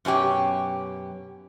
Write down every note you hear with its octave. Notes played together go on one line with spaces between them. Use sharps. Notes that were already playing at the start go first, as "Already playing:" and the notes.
F#2 B2 C#4 G4